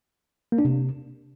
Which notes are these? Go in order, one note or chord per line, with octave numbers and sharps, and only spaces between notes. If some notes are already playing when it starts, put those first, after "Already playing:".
A#3
D4
C3